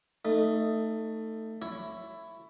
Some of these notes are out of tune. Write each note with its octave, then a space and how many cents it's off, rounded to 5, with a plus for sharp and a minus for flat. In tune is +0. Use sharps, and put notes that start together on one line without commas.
A3 +15 D#4 +0
E4 +10 C#5 +0